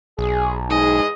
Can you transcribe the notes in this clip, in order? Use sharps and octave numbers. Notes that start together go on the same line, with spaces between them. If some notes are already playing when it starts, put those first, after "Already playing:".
B1 G#4
E2 G#2 G#3 G#4 D#5